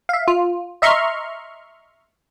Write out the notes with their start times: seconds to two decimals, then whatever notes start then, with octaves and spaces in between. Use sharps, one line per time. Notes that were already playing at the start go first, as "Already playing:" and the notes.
0.09 E5 F5
0.28 F4
0.82 D#5 E5 A#5 C6 C#6 F6